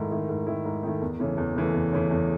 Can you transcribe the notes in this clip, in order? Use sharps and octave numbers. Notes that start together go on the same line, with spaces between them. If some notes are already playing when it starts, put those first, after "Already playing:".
Already playing: G#2 D#3 A3 E4
D#3 A3 E4
G#2
D#3 A3 E4
G#2
D#3 A3 E4
E2
C#3 E3 A3
E2
C#3 E3 A3
E2
C#3 E3 A3
E2